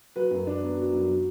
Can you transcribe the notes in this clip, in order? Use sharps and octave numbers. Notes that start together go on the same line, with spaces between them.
F#3 B4
F#2
D4
B3
F#3
F#2
F#3